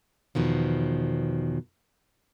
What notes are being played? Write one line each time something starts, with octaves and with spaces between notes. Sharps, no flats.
E2 B2 D#3 F3